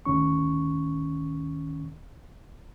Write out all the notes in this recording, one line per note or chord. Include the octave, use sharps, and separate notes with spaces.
D2 A2 D#3 C#4 C#6